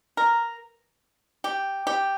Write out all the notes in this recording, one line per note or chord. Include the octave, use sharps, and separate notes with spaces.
A#4
G4
G4